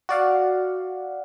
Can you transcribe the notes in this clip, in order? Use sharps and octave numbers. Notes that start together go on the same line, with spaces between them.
F#4 D5 F5 F#5